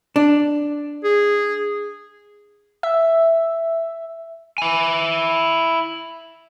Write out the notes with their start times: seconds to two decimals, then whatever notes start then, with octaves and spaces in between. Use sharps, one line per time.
0.16 D4
1.04 G#4
2.83 E5
4.58 E4 G#5